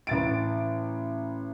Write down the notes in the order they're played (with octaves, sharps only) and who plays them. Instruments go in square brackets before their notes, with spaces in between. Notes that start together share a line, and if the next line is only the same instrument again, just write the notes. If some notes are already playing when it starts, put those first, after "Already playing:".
[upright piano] A1 A6 D7